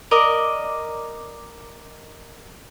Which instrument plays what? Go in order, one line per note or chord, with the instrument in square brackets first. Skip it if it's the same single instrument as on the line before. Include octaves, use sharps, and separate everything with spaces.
[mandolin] A#4 D5 D#5